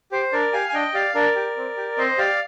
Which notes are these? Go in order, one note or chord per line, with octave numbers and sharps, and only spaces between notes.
G4 C5
D4 A#4 D5
G4 F5 G#5
G#5
D4 D#5 G5
G4 D5 F5
D4 A#4 D5
G4
C4
G4
C4 C5 D#5
G4 D5 F5